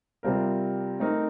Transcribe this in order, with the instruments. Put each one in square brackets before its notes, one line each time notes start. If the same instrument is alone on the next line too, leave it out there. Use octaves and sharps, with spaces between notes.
[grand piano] C3 G3 C4 F4 A#4
A3 C4 D#4 A#4